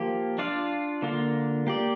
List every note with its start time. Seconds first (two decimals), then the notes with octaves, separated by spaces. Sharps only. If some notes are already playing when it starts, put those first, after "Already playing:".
Already playing: F3 A#3 G4
0.38 D4 F4 D5 F5
1.02 D3 A#3 F4
1.67 A#3 G4 D5